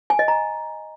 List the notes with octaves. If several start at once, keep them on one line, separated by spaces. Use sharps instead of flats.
G#5
D#5
A#5